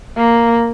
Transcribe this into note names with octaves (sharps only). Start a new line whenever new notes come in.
A#3